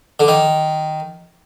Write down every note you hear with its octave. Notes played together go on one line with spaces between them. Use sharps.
D3
D#3